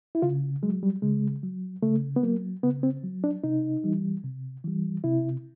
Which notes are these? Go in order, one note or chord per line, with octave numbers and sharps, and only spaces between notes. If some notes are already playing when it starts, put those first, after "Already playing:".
E4
C#3 F4
F#3 G#3
G3
C#3 G#3
F#3
C#3 A3
B3
F#3 A#3
C#3 B3
C4
F#3
D4
C3 D#4
E3 G3
C3
E3 G3
C3 E4